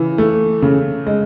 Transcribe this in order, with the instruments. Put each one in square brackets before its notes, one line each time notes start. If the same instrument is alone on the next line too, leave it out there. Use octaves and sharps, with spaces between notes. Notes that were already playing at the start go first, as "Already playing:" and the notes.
Already playing: [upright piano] C#3 E3
A3
C#3
G#3